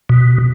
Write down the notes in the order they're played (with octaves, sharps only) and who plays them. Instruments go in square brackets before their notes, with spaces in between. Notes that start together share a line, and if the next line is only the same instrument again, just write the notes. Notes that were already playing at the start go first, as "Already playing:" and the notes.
[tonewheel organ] B2